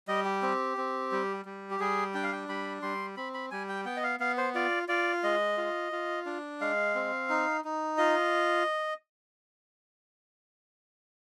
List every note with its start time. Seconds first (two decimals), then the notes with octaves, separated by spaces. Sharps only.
0.08 G3 D#5
0.25 G4
0.42 C4
0.77 C4
1.12 G3
1.45 G3
1.71 G4
1.80 G3 G#4
2.14 D4 G5
2.23 F5
2.32 G5
2.49 G3 B5
2.82 G3 C6
3.17 C4 B5
3.34 B5
3.51 G3 G#5
3.69 G5
3.85 B3 G5
3.97 D#5
4.03 F5
4.20 B3 F5
4.37 C5
4.55 F4 D5
4.88 F4 D5
5.23 G#3 D#5
5.58 F4
5.92 F4
6.26 D4
6.61 G#3 F5
6.95 C4
7.30 D#4
7.64 D#4
7.97 F4 D#5